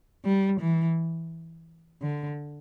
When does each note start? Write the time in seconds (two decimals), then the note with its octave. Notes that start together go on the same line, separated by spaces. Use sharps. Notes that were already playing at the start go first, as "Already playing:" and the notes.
0.24 G3
0.61 E3
2.02 D3